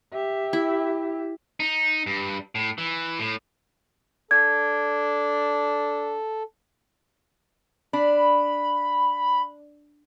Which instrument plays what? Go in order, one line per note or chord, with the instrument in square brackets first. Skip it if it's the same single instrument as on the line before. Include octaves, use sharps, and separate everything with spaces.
[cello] G4 E5
[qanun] E4
[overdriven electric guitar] D#4
G2
A2
E3
A2
[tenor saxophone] D4 [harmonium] A4 [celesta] G#6
[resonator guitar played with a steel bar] D4 [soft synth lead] B5